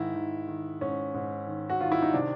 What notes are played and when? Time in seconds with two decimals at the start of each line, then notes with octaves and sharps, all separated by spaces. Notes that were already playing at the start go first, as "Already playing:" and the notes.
Already playing: G#2 D#3 E4
0.15 D#3
0.48 D#3
0.81 G#2 C#4
1.14 G#2
1.47 D#3
1.69 F#4
1.80 D#3 F4
1.92 E4
2.02 D#4
2.13 C3 D4